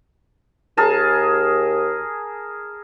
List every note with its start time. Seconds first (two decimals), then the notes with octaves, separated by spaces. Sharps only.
0.77 D#2 G#4 A#4 A5